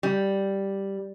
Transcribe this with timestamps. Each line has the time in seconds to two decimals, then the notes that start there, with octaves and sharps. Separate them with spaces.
0.03 G3